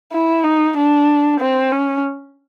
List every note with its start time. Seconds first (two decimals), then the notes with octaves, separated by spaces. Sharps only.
0.13 E4
0.44 D#4
0.77 D4
1.41 C4
1.72 C#4